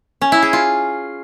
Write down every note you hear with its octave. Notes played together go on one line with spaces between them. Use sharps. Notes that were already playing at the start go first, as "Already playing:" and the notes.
C#4
E4
G#4
F4